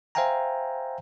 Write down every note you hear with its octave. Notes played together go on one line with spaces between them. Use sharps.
C5 E5 F5 G5 G#5 A#5